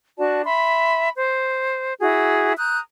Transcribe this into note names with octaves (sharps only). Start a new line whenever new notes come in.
D4 F#4 D5 A5
E5 B5 C6
C5
E4 F#4 G#4
A#5 D#6 F#6 G6